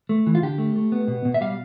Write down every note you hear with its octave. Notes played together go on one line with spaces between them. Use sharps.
A3
E3
F4
D3 G4
A3
A3
B3
B2
B2
E5
G3 F5